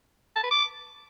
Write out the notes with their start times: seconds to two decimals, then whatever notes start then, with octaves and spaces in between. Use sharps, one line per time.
0.36 A5
0.43 B4
0.51 D6